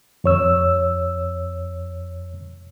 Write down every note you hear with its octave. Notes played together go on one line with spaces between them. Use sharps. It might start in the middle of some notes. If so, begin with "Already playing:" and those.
F2 C#5 E6